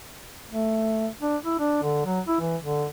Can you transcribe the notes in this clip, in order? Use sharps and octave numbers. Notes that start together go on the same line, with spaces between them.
A3
D4
E4
D4
D3
F#3
E4
E3
D3